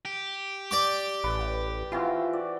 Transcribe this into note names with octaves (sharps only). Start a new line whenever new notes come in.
G4
D5 G5 D6
A1 B4
E3 C4 F4 F#4
D5